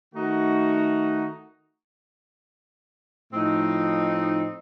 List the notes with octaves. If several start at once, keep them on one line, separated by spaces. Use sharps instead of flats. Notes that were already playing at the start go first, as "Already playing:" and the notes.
D#3 A3 D#4 F#4
A2 F3 C4 D#4